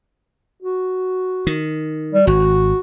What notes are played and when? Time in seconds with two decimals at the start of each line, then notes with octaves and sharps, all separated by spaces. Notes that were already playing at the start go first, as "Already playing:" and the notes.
0.62 F#4
1.47 D#3
2.14 G3
2.27 G#1 F#4